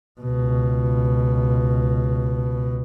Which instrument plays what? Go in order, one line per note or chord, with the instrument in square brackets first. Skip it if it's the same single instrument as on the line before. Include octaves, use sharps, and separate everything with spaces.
[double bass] C#2 B2